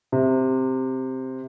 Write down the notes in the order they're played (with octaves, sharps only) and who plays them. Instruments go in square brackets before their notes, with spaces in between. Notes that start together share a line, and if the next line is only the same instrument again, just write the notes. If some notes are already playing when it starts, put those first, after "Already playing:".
[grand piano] C3